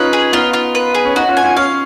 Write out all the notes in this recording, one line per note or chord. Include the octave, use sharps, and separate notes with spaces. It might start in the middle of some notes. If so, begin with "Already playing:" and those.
Already playing: C#4 D#4 F4 B4
G#4
B3 D#4 F4
F4
B4
G#4
C#4
B3 D#4 F#4
C#4 F4
G#5
C#4 F4
C#4 F4 F5